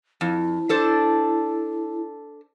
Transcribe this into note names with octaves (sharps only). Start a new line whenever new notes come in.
F2 E4
D4 A4 C5